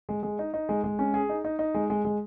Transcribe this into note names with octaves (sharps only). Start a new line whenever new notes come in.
G#3
G#3
D#4
D#4
G#3
G#3
C#4
G#4
D#4
D#4
D#4
G#3
G#3
G#3